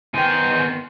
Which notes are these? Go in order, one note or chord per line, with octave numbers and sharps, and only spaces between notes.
D#3 B3 C5 G5 G#5